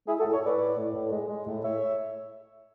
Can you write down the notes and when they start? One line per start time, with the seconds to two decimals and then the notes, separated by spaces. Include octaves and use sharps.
0.07 G#3 E4 G#4
0.20 F#4 A4
0.25 A2
0.33 A4 C#5
0.42 A2 B4 D5
0.59 A2
0.77 A2
0.94 A2
1.11 G#3
1.29 G#3
1.46 A2
1.64 A2 C#5 E5